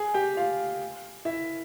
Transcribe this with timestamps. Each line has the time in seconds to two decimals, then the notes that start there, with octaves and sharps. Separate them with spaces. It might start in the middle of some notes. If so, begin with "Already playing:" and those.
Already playing: G#4 G#5
0.14 G4 G5
0.37 F4 F5
1.25 E4 E5